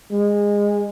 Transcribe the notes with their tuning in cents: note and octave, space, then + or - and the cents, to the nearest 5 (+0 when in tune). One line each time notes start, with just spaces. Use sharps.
G#3 -20